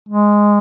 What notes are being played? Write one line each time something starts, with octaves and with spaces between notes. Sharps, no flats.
G#3